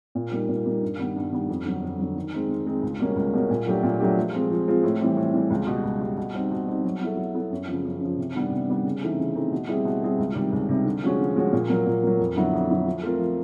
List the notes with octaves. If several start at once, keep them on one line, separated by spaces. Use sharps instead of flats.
A#2
G3 A#3 D#4
A#2
G3 A#3 D#4
G2
D#3 G3 B3
G2
D#3 G3 B3
F2
D3 F#3
F2
D3 F#3
D#3
G#3 C4 D#4
D#3
G#3 C4 D#4
C#2
B2 G3 A#3 C#4
C#2
B2 G3 A#3 C#4
A#2
F#3 A3 D4 G4
A#2
F#3 A3 D4 G4
F3
G#3 C4 F4
F3
G#3 C4 F4
A2
E3 G3 C4
A2
E3 G3 C4
C#2
B2 G3
C#2
B2 G3
B2
G3 C4 D#4
B2
G3 C4 D#4
F#3
B3 E4 A4
F#3
B3 E4 A4
F#2
C#3 F3
F#2
C#3 F3
C3
D#3 G3 B3 D4
C3
D#3 G3 B3 D4
C#3
E3 A3 C4 D#4
C#3
E3 A3 C4 D#4
B2
G3 C4 E4 G#4
B2
G3 C4 E4 G#4
C#2
C3 D#3 G3
C#2
C3 D#3 G3
D3
F3 G#3 C#4 F#4
D3
F3 G#3 C#4 F#4
A#2
F#3 A#3
A#2
F#3 A#3
F2
D3 F#3 B3 E4
F2
D3 F#3 B3 E4
F3
A3 C4 F4 A#4
F3